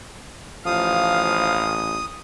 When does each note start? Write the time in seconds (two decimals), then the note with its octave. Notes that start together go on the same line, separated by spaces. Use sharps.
0.66 A1 F3 F5 D#6